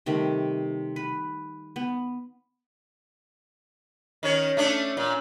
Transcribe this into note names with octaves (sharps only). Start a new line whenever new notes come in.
C3 D#3 G3 A3
B4
B3
D#3 C#4 C#5
A3 C#4 D4
A#2